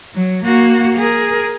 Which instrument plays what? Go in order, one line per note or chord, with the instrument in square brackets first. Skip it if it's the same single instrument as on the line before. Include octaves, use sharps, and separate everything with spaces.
[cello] F#3
A#3 F#4
G#4 A#4